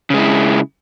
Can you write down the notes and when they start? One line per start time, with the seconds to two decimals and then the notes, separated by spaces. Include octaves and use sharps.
0.10 C#3
0.14 G#3
0.18 E4